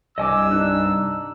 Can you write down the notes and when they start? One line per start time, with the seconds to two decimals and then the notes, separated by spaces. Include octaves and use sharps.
0.18 C2 G2 D#5 G#5 D6 E6
0.51 D4 D#4 F#6